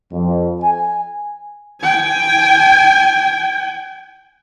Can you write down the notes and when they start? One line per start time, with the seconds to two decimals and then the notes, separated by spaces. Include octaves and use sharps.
0.13 F2
0.63 G#5
1.81 G5 G#5